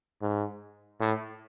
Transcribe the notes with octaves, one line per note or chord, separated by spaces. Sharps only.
G#2
A2